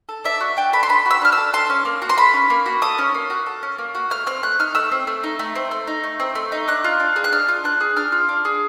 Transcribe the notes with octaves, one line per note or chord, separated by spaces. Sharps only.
A4
D4 E5
F#4
D4 G5
A4 B5
C6
D4 B5
F#4 E6
D4 F6
E6
A4
A4 C6
C#4
A#3
F#4
C6
A4 B5
C#4
A#3
F#4
A4 D#6
C#4
A#3
F#4
A4
C#4
A#3
F#4
A3 F6
C4 F6
A3 F#6
D#4 F6
A3 E6
C4
A3
D#4
A3
C4
A3
D#4
A3
C4
A3
D#4
D4 F#6
F4
D4
G#4
F#6
D4 F6
F4
D4 F#6
G#4
D4 F6
F4
D4
G#4